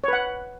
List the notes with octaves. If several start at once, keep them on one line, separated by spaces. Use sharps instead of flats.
B4 C#5 F#5